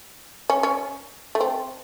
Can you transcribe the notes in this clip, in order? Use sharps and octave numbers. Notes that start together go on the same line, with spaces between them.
C#4
C#4
A3
C4